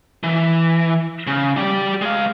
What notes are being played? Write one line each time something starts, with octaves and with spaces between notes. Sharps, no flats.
E3
C#3
G4 D5
G#3 F5